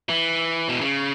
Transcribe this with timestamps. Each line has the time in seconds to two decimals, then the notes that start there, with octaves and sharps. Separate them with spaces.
0.09 E3
0.69 B2
0.81 C#3